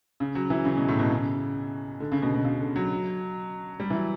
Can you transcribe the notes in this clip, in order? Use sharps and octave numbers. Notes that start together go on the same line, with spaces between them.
C#3
F#3
E3
C#3
B2
A2
B2
C#3
D3
C#3
B2
B2
C#3
D3
F#3
G3
E3
F#3